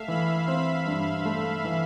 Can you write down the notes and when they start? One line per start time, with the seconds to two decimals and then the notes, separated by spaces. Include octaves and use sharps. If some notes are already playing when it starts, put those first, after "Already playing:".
Already playing: A3 E5 F5
0.08 E3 B5
0.48 C4 B5
0.86 G2
1.25 A3
1.64 E3